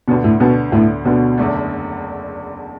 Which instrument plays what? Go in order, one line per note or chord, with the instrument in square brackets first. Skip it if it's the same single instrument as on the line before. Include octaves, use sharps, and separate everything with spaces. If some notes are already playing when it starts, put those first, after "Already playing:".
[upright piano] D2 D3 B3 [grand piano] B2
[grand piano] A2
[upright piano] D2 D3 B3 [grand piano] B2
[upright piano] D2 D3 B3 [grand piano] A2
[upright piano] D2 D3 B3 [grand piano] B2
[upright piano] F#1 E2 D3 A3 D4